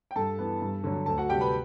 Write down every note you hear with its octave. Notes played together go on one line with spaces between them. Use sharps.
G5
G2 A4 A5
E3 B3
G2
D3 F#3
D2 A4 A5
F#4 F#5
C3 G3 G4 G5
B4 B5